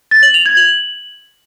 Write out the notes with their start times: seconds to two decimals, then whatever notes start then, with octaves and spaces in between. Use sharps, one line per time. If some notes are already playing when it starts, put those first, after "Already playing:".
0.11 A6
0.23 F#7
0.34 F7
0.46 G#6
0.57 F#7